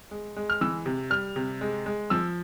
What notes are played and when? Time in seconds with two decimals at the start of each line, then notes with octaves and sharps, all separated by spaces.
0.11 G#3
0.36 G#3
0.50 F6
0.61 E3 E6
0.86 C3
1.10 G3 F6
1.36 C3
1.61 G#3
1.86 G#3
2.10 F3 E6